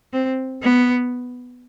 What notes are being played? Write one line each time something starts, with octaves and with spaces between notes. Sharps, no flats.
C4
B3